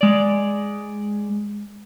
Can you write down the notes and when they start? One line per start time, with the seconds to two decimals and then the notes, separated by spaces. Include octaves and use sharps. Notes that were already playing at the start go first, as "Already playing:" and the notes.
0.01 G#3 D5